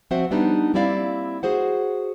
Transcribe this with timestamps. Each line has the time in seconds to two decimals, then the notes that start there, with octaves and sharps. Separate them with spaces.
0.11 F3 C4 F#4 C5 E5 F#5
0.31 G3 B3 D4 D#4
0.74 G3 A#3 C4 E4 D5 F5
1.43 F#4 G#4 C5 F#5